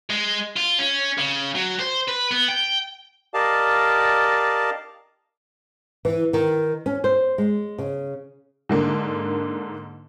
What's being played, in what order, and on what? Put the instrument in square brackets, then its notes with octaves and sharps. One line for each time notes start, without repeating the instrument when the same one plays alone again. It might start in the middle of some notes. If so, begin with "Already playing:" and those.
[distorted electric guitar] G#3
F4
C#4
C#3
F#3
C5
B4
B3
G5
[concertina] G4 A#4 D5 D#5 F5 A5
[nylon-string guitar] E3
D#3
C#4
C5
G#3
C#3
[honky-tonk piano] G#2 D3 A#3